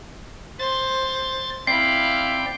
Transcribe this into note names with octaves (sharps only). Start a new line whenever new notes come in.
C5 A6
C4 E4 D5 F5 G5 C7